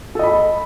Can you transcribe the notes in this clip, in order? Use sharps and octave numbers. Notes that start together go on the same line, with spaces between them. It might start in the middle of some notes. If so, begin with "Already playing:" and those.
A4 D#5 B5